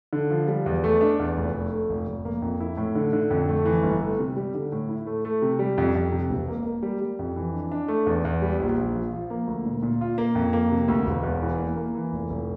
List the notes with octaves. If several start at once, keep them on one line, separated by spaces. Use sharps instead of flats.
D3
F3
G3
E2
A3
D4
E2
F1
A3
A3
F1
F1
A#3
F2
E4
A2
D3
D3
F2
A3
E3
G1
A3
C3
G3
D3
A2
E4
A3
A3
C3
G3
F2
F2
C3
E1
A#3
A#3
G3
G3
F2
E3
D4
D4
A3
E2
E2
G3
A#1
A#1
F3
F3
A#3
D2
A#2
A#2
F4
A#3
F2
A#3
C3
D2
E1
E2
E3
A#3
A#3
E3
F1
F1